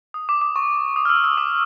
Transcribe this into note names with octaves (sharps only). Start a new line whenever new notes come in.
D#6
D6
D6
C#6
D#6
F6
E6
E6
D6